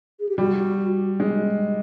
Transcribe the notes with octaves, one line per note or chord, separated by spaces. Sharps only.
G#4
G4
G3 F#4
G#3